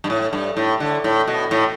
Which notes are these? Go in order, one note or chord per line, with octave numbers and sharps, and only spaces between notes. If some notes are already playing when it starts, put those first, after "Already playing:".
G2
A2
G2
A2
D3
A2
B2
A2